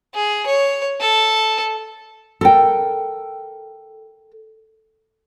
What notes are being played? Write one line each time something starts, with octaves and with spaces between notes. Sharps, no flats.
G#4
C#5
A4
A4 A#4 G5